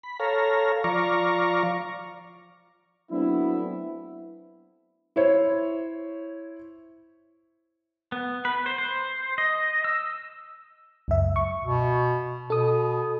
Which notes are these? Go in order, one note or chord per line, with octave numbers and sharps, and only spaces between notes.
B5
A4 C#5 F5 A#5
F3 D5 F5 A#5 C#6
F#3 A3 B3 C4 D4 E4
E4 C5 C#5
B3
B4
C5
C5
D#5
E6
C#2 F#2 E5
C#6
B2
B2 A4 D#6